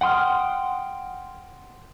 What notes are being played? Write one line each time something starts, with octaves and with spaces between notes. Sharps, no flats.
F#5 G5 C6 D#6 F6